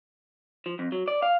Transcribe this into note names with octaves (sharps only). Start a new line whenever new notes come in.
F3
F2
F#3
D5
F5